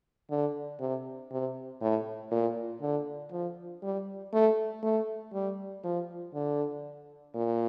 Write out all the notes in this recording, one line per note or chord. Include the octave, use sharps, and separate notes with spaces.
D3
C3
C3
A2
A#2
D3
F3
G3
A3
A3
G3
F3
D3
A#2